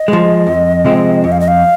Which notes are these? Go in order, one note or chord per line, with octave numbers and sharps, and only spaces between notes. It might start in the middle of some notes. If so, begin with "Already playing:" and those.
Already playing: D#5
G#3
F3
F2
C3 F3 G#3 C4
F2
F5
D#5
F5